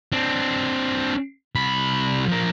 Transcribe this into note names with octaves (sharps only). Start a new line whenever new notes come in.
C4 D4
C2 B5
F3 A#4